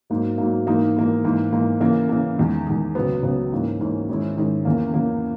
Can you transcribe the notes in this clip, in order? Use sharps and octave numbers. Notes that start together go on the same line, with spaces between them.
G#2 F#3 A#3
G#2 F#3 A#3
G#2 E3 A#3 D#4
G#2 E3 A#3 D#4
G#2 E3 A#3
G#2 E3 A#3
C#3 E3 A#3
C#3 E3 A#3
E2 D#3 G#3
E2 D#3 G#3
C#2 C#3 F#3 B3
C#2 C#3 F#3 B3
G#2 E3 A#3 C#4
G#2 E3 A#3 C#4
G#2 D#3 G#3 C#4 E4
G#2 D#3 G#3 C#4 E4
E2 C#3 E3 A#3
E2 C#3 E3 A#3